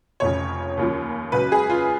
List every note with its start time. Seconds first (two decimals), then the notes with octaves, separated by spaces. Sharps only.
0.20 F1 F2 C#3 C#5
0.77 D#2 C#3 F3
1.32 C#2 C#3 F#3 B4
1.52 G#4
1.69 F4